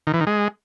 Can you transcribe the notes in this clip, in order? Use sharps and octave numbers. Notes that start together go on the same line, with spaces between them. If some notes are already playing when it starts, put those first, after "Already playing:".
D#3
E3
D#3
G#3